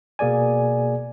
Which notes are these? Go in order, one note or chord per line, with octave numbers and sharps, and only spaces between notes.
B2 A#3 G#4 D5 G#5